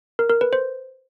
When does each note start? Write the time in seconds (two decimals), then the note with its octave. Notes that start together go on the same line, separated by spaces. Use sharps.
0.19 A#4
0.30 A#4
0.41 B4
0.53 C5